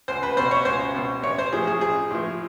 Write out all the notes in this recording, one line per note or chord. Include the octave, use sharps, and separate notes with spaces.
C#2 C5
B4
B2 C5
C#5
C#2 C5
B2
A1 C#5
C5
A2 F3 G#4
G#4
A1 G#4
A2 F3